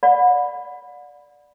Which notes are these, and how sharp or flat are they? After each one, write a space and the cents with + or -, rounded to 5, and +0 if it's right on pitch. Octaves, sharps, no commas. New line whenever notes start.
D5 +0 F#5 -35 B5 +0